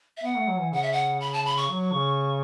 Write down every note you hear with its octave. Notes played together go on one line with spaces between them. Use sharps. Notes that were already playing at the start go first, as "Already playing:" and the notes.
E5
B3 F#5
A3
F#3
E3
C#3 F#5
E5
F#5
B5
A5
B5
C#6
F#3
C#3